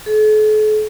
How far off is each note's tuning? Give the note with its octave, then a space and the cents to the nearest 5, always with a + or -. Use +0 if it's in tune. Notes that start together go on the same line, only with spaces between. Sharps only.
A4 -45